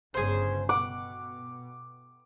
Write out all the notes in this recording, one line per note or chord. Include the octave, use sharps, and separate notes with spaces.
G1 G2 C#3 G#4 C5
B2 F#5 D6